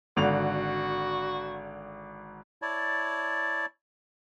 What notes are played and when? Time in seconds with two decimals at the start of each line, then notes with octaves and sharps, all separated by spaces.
0.17 G#1 D3 F#4 F7
2.62 E4 C#5 D5 A5